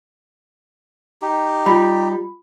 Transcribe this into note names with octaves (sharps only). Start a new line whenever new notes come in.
D#4 G4
G3 F4 B5